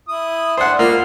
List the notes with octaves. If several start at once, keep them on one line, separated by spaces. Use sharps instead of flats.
E4 D#6
D4 C5 F#5
A#3 F4 F6